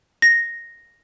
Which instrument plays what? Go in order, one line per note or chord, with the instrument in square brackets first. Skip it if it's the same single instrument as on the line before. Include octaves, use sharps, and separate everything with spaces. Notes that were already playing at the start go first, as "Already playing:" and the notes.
[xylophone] A#6